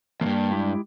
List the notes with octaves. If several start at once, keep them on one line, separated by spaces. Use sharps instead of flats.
E2 G2 A#3
G#3 E4 G4